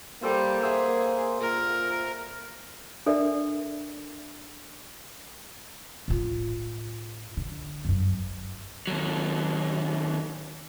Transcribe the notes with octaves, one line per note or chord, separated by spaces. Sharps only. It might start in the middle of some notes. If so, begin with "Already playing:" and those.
G3 A#3 G4 A4 C5
G#4 C5 E5 F#5
A#2 A#4
D4 A4 A#4 D5 E5
A2 F4
D3
G1 F#2
D#2 F#3